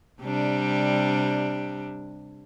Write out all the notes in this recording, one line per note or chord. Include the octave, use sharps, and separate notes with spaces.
C3 G3 D4